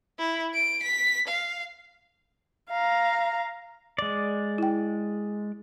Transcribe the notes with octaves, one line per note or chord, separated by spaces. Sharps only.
E4
D7
B6
F5
F5 A#5
G#3 D5
E4 G5